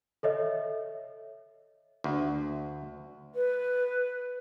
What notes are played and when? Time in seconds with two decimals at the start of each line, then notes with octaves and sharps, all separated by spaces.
0.23 A4 C#5 D#5 E5
2.04 D2
3.35 B4